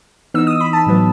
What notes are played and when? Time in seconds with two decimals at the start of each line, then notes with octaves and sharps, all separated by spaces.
0.34 E3 B3 D#4 E6
0.47 D#6
0.60 B5
0.73 A5
0.86 A2 F#3 B3